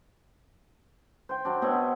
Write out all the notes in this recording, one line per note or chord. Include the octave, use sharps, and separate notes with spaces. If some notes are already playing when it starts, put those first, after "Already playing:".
C5 G5
F#3 D4
B2 B3 C4 C#5